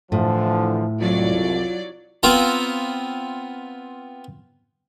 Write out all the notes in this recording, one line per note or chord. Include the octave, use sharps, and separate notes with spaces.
A2 D3 E3 F3
C2 F2 F#3 F4 D5
B3 C4 F4 A#5